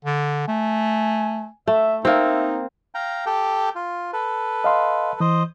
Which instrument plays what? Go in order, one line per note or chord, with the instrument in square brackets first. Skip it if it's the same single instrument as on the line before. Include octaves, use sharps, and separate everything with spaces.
[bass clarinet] D3
[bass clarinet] A3 [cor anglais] G#5
[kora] A3 [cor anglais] E5
[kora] A#3 C4 [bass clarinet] D#4 [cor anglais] E5
[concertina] F5 G5 A#5
G4 A4 G5
F4
A4 B4
[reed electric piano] D#5 F5 C6
[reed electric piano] E3 [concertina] C5 D#5